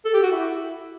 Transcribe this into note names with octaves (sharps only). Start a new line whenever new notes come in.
A4
G4
F#4
E4